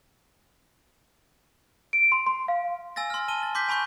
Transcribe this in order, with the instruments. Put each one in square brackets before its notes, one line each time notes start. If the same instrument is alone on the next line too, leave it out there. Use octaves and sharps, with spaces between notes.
[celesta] D7
C6
C6
F5
[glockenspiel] G#5 E6 A6 A#6
C6 F6
A5 D#7 G7
A6
C6 D6 G6 B6
G#5 B5 C#6 G6